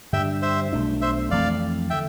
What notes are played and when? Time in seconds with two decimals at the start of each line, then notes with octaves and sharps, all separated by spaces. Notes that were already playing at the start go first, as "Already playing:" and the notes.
0.13 G2 D3 G3 E5 G5
0.42 C5 E5
0.73 B1 B2 A3 D4
1.01 C5 E5
1.31 F2 E3 A3 C4 D5 F5
1.90 D3 E5 G5